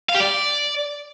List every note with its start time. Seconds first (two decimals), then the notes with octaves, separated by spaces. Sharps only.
0.09 F5
0.15 G4
0.20 D5